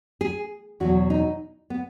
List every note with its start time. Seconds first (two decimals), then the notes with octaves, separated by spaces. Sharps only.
0.21 G#4
0.80 E2 B2 F#3 F#4
1.10 D#4
1.70 B3